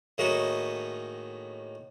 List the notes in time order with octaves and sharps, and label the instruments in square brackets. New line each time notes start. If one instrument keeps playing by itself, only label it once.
[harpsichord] A2 D#3 G#3 A#3 F#4